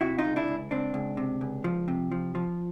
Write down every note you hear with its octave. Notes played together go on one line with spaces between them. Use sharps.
C3 E4 F#4
D#4 F4
C#2
D4 E4
C#2
C#2 C4 D4
C#2
C3
C#2
F3
C3
F3
F3